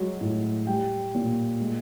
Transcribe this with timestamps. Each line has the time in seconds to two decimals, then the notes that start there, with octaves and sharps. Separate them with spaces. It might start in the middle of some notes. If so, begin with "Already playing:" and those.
Already playing: F#3 G#3
0.21 A2
0.67 G3 G5
1.15 A#2
1.61 G#3